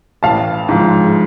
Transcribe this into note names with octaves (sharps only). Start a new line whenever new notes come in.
A1 F5 A5
G#2 F3